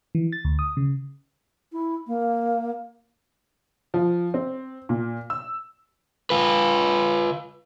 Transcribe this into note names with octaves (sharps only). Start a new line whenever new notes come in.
E3
A6
D2
D#6
C#3
E4
A#3
F3
C4
A#2
E6
F4 B4